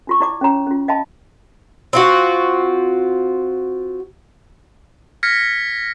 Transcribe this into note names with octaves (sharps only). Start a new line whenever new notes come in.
D4 F4 C#6
E4 D5 D6
C#4 C#5 A#5
C#4 F4
D#5 F5 G5 A5 B5
C4 F4 F#4
F6 G#6 A#6 B6 C#7